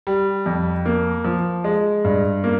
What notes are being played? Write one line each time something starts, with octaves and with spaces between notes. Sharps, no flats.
G3
F2
A#3
F3
G#3
G2
A#3